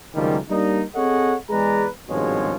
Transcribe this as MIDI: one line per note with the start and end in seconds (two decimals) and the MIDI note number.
0.15 0.38 37
0.15 0.38 42
0.15 0.38 51
0.15 0.38 53
0.15 0.38 55
0.15 0.38 58
0.49 0.82 55
0.49 0.82 58
0.49 0.82 62
0.49 0.82 63
0.95 1.35 60
0.95 1.35 68
0.95 1.35 69
0.95 1.35 73
0.95 1.35 75
0.95 1.35 78
1.50 1.87 40
1.50 1.87 56
1.50 1.87 68
1.50 1.87 71
1.50 1.87 74
1.50 1.87 82
2.08 2.54 32
2.08 2.54 43
2.08 2.54 47
2.08 2.54 53
2.08 2.54 56
2.08 2.54 73